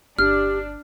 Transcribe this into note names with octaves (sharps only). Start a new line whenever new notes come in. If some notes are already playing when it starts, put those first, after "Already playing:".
G1 D4 G4 F6